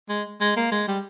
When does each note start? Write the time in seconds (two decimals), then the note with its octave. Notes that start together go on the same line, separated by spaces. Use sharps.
0.09 G#3
0.41 G#3
0.56 A#3
0.71 G#3
0.88 G3